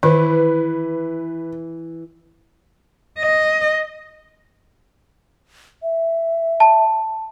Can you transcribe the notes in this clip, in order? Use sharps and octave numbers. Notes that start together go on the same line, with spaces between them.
D#3 E3 B4
D#5
E5
A5